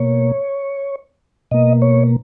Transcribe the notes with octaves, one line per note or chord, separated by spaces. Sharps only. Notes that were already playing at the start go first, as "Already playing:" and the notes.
Already playing: B2 A#3 C#5
B2 A#3 D#5
C#5